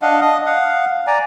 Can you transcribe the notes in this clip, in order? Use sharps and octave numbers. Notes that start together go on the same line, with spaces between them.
D4 D#5 F5 F#5
D#5 D#6
F5 F#5
D5 G#5 A#5